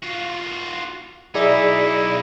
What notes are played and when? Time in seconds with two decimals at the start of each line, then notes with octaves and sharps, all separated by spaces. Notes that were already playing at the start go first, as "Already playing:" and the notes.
0.02 F4 F#4
1.35 B1 D#4 E4 G#4 D5 E5